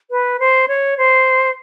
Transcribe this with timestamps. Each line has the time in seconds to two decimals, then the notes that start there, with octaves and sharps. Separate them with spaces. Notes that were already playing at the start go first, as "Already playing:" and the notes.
0.10 B4
0.39 C5
0.68 C#5
0.97 C5